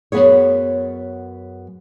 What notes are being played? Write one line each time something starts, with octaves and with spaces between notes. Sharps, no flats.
F#2 C3 B3 G#4 C#5